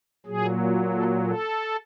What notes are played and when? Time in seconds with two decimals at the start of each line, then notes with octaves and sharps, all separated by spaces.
0.26 A#2 F#3 G#4
0.94 A4
1.27 A4